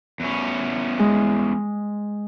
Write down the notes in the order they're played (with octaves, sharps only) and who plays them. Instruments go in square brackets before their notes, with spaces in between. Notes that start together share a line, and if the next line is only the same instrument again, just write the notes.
[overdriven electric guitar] E2 C#4
[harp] G#3